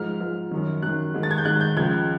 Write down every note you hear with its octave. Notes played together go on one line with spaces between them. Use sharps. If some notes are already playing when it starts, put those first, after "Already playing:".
Already playing: G#2 F3 F6
G#2 F3
F#2 D#3
F#2 D#3 F#6
G#2 D#3
A6
G#6
G6
G#2 D#3 F#6
G6
C#2 C#3 F3 G#6